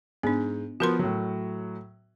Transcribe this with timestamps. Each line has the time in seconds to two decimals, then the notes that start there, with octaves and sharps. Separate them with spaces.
0.23 G#2 B3 D4
0.80 F3 B3 F#4 A#4 C6
0.99 A2 F#3